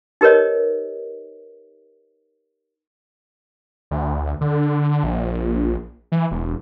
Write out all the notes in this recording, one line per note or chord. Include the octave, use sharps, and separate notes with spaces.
D#4 G4 A#4 B4 C#5 D#5
D2
D3
A#1
E3
E1